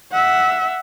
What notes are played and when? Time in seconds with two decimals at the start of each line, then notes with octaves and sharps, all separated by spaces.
0.12 E5 F#5